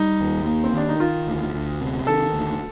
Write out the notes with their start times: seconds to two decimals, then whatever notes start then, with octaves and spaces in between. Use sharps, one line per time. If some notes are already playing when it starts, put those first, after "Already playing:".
Already playing: G3 D#4
0.20 D#2
0.46 A#3
0.64 C4
0.73 D#3 D4
0.88 D#4
1.00 D#3 F4
1.27 D2
1.54 D2
1.81 C3
2.07 D#3 A4
2.34 D2